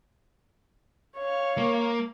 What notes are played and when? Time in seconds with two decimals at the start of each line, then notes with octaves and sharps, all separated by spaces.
1.17 C#5 F5
1.58 A#3